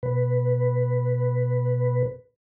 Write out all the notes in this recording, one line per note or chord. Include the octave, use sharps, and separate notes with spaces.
B2 B4